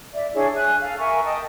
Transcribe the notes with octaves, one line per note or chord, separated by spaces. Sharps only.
D5 E5
D4 E4 G#4 C#5
E5 G#5 F#6
A4 F5
A#4 E5 G#5 C#6
D#5 G5 A5 D#6